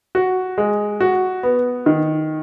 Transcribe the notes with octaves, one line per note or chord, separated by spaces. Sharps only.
F#4
G#3
F#4
B3
D#3